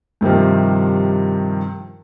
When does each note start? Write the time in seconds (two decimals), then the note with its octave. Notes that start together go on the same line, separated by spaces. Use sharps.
0.21 G2 C3 D#3 F3